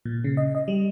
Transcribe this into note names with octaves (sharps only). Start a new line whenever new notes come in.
A#2
C#3
D#5
D#5
G3